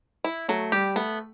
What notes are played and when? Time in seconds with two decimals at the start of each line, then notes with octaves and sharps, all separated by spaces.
0.24 E4
0.48 F#3 A3
0.72 G3 G4
0.95 A3 B3